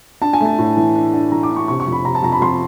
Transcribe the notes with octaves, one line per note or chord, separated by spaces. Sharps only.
D4 A5
G#5
A3
A5
A2
E3
D4
D4
E3 A#5
D6
D4
C#6
C3 C#6
C#6
F2
B5
C3 A#5
A5
F2 A#5
B5
F2 C6